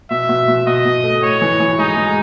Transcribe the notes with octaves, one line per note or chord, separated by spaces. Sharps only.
B2 E5
B2
B2
B2 D#5
B2
A3
A2 C#5
E3
E3
G#3 D#4
G#3